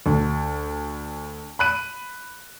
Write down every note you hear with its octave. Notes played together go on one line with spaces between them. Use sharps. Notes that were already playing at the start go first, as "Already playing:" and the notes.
D2
B5 F#6 D#7